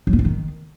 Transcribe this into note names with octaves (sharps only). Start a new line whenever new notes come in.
F#3
A#3
F3
D#3